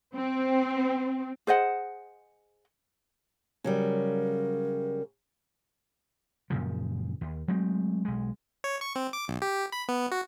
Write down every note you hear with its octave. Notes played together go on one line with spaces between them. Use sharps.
C4
G#4 C5 D#5 F#5
C#3 F#3 G3 A#4
F#2 A#2 C#3 F3
D#2
F#3 G#3 A3 C4
B1 G#3
C#5
C#6
C4
D6
B1
G4
B5
B3
F#4